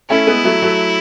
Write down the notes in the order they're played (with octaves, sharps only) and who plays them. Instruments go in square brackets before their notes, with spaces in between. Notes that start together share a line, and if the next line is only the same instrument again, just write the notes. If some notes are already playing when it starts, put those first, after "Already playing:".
[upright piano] A3 C#4 [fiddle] E4
[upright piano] G#3 B3
F#3 A3
F#3 A3